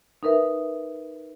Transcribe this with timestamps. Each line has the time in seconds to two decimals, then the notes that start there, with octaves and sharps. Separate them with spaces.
0.23 D#4 A#4 B4 E5